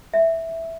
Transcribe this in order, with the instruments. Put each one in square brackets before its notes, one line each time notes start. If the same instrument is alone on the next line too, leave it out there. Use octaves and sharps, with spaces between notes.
[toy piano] E5